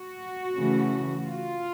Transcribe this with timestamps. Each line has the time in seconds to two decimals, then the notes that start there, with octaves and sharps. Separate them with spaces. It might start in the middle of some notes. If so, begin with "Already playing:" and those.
Already playing: F#4
0.56 C#3 E3 A3 C#4
1.27 F4